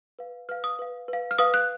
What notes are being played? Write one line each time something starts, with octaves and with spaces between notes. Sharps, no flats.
B4 F5
B4 F5 F6
D#6
B4 F5
B4 F5
F6
B4 F5 D#6
F#6